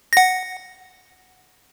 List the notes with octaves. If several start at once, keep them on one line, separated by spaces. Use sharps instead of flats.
F#5 A#6